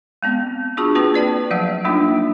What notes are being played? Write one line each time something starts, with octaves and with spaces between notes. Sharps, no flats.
G#3 B3 C4
D4 F4 F#4 G#4 A5 C#6
A#3 C4 F4 B4
B4 D5 G5 A5
F3 F#3 A3 F5
G3 A#3 D4 D#4 F4